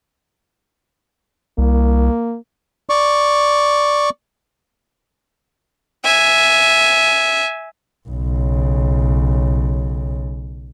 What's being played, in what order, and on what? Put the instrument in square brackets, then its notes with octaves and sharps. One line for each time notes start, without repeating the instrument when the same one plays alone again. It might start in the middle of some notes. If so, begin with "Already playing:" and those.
[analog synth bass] C2 [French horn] A#3
[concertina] D5 C#6
[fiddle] E5 G#5
[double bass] B1 C#3